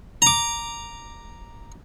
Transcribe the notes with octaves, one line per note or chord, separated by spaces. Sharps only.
A#5 D6